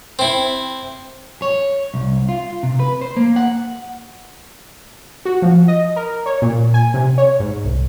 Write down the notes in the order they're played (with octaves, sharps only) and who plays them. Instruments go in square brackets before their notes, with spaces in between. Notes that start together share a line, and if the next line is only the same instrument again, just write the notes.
[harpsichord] C4 E4
[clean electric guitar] C#5
C2
F4
C3
B4
C5
A#3
F#5
[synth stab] F#4
F3
D#5
A#4
C#5
A#2
G#5
C3
C#5
G#2
C2